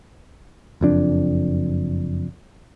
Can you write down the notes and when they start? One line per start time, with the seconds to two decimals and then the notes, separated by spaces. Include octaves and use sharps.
0.81 F#1 F2 D4